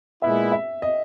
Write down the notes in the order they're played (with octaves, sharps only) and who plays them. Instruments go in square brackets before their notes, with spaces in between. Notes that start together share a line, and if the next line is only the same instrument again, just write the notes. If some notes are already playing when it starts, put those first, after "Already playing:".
[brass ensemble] A#2 G#3 B3 E4 [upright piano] E5
[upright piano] E5
D#5